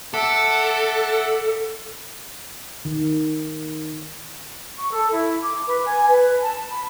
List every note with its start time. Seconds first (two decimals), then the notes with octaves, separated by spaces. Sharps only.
0.14 A4 E5 F#5 D6
2.85 D#3
4.78 C#6
4.92 A4
5.12 E4
5.42 D6
5.68 B4
5.85 G#5
6.08 B4
6.41 A5
6.68 B5